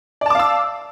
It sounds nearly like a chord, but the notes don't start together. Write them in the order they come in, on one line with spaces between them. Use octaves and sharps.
D5 A5 D6 F5 E6